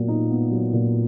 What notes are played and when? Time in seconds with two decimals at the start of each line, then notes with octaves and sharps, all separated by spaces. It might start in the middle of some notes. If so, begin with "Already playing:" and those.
Already playing: A#2 F#3 B3
0.08 D#4
0.30 B3
0.51 F#3
0.73 A#2